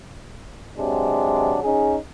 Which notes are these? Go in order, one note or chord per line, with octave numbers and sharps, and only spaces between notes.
C3 F#3 G#3 D4
C#4 D#4 G#4